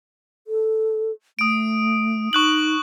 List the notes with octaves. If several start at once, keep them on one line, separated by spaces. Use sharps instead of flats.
A4
A3 D#6 D7
D#4 C#6 F#6 F#7